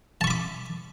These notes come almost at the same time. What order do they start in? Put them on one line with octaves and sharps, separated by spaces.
A5 C#6 B5 D6